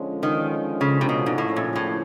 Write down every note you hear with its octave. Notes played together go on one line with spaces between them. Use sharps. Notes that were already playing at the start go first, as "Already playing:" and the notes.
Already playing: D3 F3 G#3 C#4
D#3
C#3
C3
B2
G#2
A2 C#3 F3 A#3 C#4 E4
A#2
A2